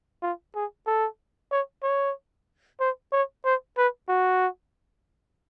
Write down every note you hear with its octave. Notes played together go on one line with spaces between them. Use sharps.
F4
G#4
A4
C#5
C#5
C5
C#5
C5
B4
F#4